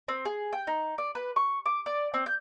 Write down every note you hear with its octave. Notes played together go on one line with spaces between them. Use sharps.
C4
G#4
G5
D#4
D5
B4
C#6
D6
D5
C4
G6